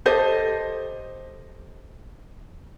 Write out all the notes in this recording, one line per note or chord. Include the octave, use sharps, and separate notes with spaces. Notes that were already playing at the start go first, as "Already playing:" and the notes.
G4 A4 C5 D#5